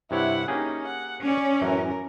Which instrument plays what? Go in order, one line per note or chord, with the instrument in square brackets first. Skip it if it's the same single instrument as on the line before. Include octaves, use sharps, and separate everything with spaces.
[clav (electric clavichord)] G2 C3 C#5 [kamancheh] E4 F#5
[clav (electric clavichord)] A#3 G4 G#4 [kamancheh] C#4 D#4
[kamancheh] F#5
[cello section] C#4 [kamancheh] C#5 D5
[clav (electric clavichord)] F#2 A2 E3 [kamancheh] A#4